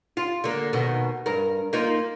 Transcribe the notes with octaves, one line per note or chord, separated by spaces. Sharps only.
F4
D3 A#3
D#2 B2 D#3
G2 A#4
A#3 D#4 F4